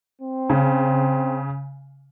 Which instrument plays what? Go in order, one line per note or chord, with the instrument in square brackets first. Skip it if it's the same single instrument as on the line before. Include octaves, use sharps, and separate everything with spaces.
[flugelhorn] C4
[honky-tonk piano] C#3